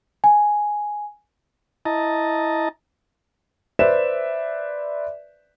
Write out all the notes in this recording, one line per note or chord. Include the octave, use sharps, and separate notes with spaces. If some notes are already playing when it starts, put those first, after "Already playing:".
G#5
E4 D#5 A5 A#5
B4 C5 D5 E5 E7